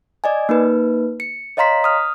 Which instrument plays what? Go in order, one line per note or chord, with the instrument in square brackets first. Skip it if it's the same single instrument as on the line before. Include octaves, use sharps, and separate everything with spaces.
[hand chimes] D5 D#5 G#5
A#3 D#4 B4
C#7
C#5 D#5 F5 A#5 C6 B6
D#6 F6